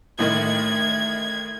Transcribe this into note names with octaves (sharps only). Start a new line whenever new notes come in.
A1 A2 D#3 G#6